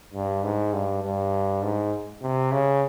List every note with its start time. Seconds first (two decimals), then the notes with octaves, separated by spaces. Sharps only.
0.14 G2
0.43 G#2
0.73 G2
1.03 G2
1.63 G#2
2.22 C3
2.52 C#3